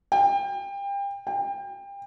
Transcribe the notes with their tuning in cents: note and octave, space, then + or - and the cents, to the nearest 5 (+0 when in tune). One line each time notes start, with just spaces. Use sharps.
G5 +30
G5 +30